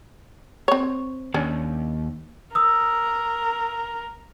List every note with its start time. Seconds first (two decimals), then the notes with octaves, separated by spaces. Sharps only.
0.68 C4 C#5
1.34 D#2 C#4 D4
2.55 A#4 D#6 E6